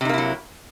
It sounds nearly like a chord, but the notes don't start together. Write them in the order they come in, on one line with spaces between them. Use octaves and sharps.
C3 D#4 A#3 E4 F#3